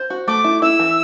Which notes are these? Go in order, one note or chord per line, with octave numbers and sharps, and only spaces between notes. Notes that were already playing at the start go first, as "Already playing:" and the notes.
Already playing: C5
F#4
A3 D6
E4
E4 E6
E3